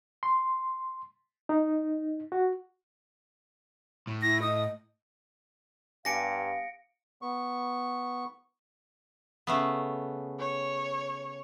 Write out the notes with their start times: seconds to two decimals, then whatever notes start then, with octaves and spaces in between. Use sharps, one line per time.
0.23 C6
1.49 D#4
2.32 F#4
4.07 A2
4.22 E4 A#6
4.42 D#5 D#6
6.05 G2 B3 G4 F5 G#5 A#6 C#7 D7
7.22 B3 C#6
9.47 C#3 A3 B3
10.40 C#5